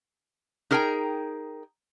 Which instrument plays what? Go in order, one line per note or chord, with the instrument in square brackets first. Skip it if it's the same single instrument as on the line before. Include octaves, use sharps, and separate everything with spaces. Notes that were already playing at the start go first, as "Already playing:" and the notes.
[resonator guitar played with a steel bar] D#4 G#4 A#4 G5 G#5 A#5